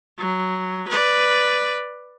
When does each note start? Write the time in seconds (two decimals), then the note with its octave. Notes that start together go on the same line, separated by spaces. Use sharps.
0.18 F#3
0.88 B4 D5